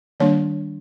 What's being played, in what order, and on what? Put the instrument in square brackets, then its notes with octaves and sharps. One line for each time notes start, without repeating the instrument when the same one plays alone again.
[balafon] D#3 G3 A#3 D4 C#5